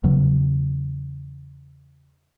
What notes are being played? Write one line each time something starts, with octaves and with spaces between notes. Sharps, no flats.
E2 C#3 F#3